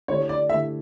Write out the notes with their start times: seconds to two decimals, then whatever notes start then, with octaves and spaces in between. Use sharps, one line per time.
0.08 D3 A3 E4 G4 C#5
0.29 D5
0.49 D3 A3 E4 G4 E5